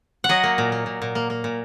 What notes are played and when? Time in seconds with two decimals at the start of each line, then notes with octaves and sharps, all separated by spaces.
0.24 F#5
0.29 F#3 D#5
0.44 A#3
0.58 A#2
0.72 A#3
0.86 A#2
1.02 A#2
1.15 A#3
1.30 A#3
1.44 A#2